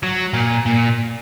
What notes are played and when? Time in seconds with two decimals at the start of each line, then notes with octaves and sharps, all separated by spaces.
0.03 F#3
0.33 A#2
0.66 A#2